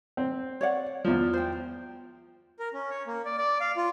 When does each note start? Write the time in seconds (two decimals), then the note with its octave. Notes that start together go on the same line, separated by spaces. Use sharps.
0.17 C4
0.61 C#5 D5 F#5
1.05 E2 F3
1.33 C5 G5
2.60 A#4
2.73 C#4
2.90 C#5
3.07 A#3
3.25 D5
3.38 D5
3.60 F5
3.77 F4